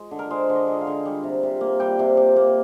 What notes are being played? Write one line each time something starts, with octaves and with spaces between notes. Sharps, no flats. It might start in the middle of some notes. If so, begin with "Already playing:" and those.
Already playing: G#3
D3
A#4
G#3 C5
D3
D#5
G#3
F5
D3
G3
C3
C3
A#3
G3 G5
C3
C3
A#3